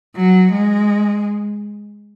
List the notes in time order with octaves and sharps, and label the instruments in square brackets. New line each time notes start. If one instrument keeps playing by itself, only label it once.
[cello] F#3
G#3